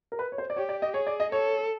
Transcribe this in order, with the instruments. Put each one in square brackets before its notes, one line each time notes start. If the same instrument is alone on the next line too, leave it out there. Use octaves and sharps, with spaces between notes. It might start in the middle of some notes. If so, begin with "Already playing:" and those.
[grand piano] A#4
B4
C#5
C5
D5
[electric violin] G4 [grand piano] C#5
[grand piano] D5
D#5
[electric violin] G#4 [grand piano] C#5
[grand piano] D5
D#5
[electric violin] A4 [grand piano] C#5